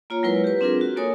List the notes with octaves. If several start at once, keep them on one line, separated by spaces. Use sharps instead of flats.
A#3 F4 C#5 A#5
F#3 G#3 E4 A#4 B4 C#5
G4 B4
C4 D4 F4 G#4 A#4
F#4
A#3 A4 A#4 C#5 G#5 D#6